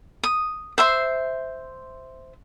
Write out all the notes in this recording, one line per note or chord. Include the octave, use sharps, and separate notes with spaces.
D#6
C5 E5 C6